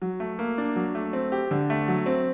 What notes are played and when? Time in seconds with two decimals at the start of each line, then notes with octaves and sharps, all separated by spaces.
0.02 F#3
0.20 A3
0.39 A#3
0.58 D4
0.76 F#3
0.95 A3
1.13 C4
1.32 G4
1.51 D3
1.70 A3
1.88 F#3
2.06 C4